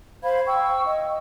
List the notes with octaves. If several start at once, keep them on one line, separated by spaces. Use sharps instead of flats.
C5 F5 B5 G#6
G5 C#6 E6
D#5